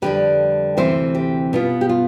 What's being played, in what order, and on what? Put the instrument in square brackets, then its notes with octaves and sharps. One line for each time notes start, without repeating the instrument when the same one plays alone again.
[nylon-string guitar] F2 D3 G3 G4 B4
D2 C3 E3 C4 C5 E5
G4
B2 B3 F4
G4
F4